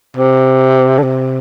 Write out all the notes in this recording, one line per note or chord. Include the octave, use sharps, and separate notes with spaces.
C3
D3
C3